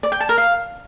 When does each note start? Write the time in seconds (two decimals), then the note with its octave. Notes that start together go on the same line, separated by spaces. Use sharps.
0.03 D5
0.12 G5
0.20 A5
0.29 A#4
0.38 F5